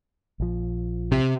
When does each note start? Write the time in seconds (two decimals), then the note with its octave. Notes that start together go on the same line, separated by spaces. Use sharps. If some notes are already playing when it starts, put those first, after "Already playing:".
0.40 A#1 F3
1.12 C3